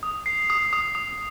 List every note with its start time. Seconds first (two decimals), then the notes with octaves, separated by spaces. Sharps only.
0.03 D#6
0.26 C7
0.50 D#6
0.73 D#6
0.95 D#6